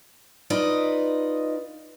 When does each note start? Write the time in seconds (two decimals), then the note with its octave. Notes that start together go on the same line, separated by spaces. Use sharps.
0.50 D#4 F4 B4 D5 D#5